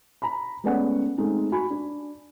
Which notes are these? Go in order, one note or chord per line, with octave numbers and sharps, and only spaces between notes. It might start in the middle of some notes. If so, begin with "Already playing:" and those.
A#5 B5
G#3 A3 B3 C#4 D5 F#5
G#3 A3 C4 D#4
F#4 G#5 B5
D4